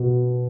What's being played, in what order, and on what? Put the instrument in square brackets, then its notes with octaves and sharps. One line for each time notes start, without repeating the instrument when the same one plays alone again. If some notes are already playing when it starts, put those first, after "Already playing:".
Already playing: [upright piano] B2